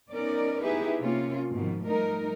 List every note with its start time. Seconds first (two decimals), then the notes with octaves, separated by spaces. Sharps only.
0.12 B3 C#4 D#4 A#4 D5
0.63 B3 D#4 E4 G4 G#4 B4
0.99 C3 A#3 C4 C#4 F4
1.51 G#2 B2 D#3 F3
1.83 F3 G3 A3 D#4 A#4